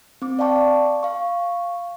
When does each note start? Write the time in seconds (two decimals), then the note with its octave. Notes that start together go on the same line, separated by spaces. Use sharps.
0.22 C4 D6
0.39 D5 F5 G5 A5 C#6 D6
1.03 F5 C#6